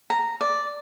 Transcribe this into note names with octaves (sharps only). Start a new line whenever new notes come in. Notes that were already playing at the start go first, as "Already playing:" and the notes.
A#5
D5